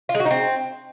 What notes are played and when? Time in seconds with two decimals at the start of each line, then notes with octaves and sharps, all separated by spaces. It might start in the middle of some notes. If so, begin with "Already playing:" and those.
0.09 F4
0.15 G#3
0.20 F#4
0.25 D#4
0.31 C4